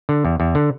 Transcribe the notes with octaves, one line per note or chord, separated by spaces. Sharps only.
D3
E2
E2
D3